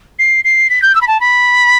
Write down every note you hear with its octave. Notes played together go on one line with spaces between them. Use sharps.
C7
C7
B6
G6
E6
B5
A5
B5